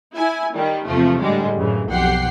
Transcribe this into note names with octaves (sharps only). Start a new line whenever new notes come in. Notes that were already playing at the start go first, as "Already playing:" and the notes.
E4 G#5
D#3 G3
E2 C3 F3 A3
A2 D3 G3 G#3
F#2 A2 C#3 E3
B1 F2 G4 F#5 G5 C7